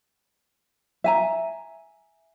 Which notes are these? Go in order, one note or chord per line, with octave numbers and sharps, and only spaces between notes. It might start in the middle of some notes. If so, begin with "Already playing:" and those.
E5 G#5 A#5